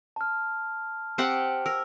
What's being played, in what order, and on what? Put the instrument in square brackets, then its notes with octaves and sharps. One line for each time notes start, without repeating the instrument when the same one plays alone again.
[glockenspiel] A5 F6
[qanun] C4 G4 F#5
[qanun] A#4 [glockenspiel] E6 F6